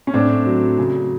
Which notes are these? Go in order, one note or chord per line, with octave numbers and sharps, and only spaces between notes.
C#4
A2 C4 D4
F#3
C#3